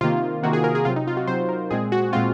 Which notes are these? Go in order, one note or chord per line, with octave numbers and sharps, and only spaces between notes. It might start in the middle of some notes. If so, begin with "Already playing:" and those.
C3 D#3 A#3 F4
C3 D#3 A#3 F#4
G#4
A#4
G#4
C3 F#3 C4 F4
D#4
F4
F#4
C3 F#3 C4 C5
A#4
A#2 G#3 C4 G#4
F#4
A#2 G#3 C4 F4